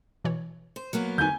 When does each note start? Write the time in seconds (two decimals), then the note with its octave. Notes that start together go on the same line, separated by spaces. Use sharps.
0.25 B2 E3 C#5
0.76 C5
0.93 F#3 A#3 B3
1.18 D3 C4 D#4 G#5 G6